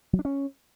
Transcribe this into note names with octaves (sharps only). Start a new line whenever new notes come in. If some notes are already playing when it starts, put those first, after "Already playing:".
F#3
D4
C#4